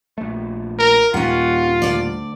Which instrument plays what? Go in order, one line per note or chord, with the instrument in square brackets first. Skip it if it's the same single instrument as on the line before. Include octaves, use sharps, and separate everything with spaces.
[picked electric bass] A#1 A3
[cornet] A#4
[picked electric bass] D#2 A#2 G3 [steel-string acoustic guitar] C#4 F#5 [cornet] F4
[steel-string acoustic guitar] D2 C#3 D5